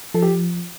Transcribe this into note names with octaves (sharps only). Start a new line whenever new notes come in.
F3 A4
G4